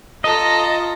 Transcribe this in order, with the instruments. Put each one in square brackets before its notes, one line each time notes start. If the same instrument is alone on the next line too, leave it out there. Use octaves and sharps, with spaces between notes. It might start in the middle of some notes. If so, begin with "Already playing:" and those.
[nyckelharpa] F4 A#5 [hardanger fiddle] A4 [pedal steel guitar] D#5